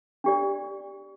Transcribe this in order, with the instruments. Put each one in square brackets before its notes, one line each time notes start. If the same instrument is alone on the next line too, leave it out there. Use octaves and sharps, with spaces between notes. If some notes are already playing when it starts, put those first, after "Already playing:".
[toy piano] D4 G4 D5